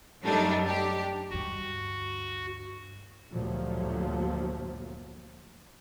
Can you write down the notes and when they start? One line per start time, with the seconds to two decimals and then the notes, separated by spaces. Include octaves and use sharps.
0.24 F#2 F#3 G3 A3 D4 D#4
0.65 D4 G4
1.30 D2 G2 F#4
3.30 G1 D2 A#2 F3 F#3 A3